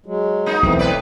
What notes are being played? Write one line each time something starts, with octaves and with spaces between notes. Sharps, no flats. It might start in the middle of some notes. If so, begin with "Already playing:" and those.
F#3 G#3
A#3 D#4
E1 B1 E3 A3 C4
A2 B4 D5